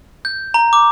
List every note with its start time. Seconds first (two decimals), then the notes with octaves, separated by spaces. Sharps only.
0.25 G6
0.54 A#5
0.73 D6